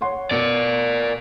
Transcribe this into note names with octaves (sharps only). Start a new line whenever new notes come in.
C#5 F#5 C6
B2 A#4 D5